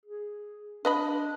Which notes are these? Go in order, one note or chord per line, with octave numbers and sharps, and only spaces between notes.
G#4
D4 B4 D#5 B5